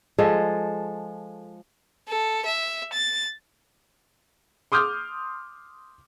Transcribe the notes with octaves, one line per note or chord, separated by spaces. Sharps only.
F3 G#3 A4
A4
E5
A6
C6 D6 D#6 F6 G6